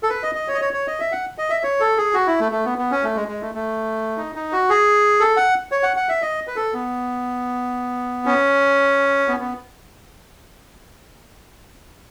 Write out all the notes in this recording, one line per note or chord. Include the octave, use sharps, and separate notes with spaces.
A4
B4
D#5
D#5
C#5
D#5
C#5
C#5
D#5
E5
F#5
D#5
E5
C#5
A4
G#4
F#4
E4
A3
A3
B3
B3
C#4
A3
G#3
G#3
A3
A3
D#4
D#4
F#4
G#4
A4
F#5
C#5
F#5
F#5
E5
D#5
B4
A4
B3
C#4
B3
B3